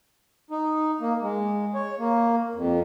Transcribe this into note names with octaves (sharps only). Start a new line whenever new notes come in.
D#4
A#3
G#3
C#5
A#3
F2